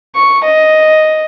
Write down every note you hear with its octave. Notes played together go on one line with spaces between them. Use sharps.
C#6
D#5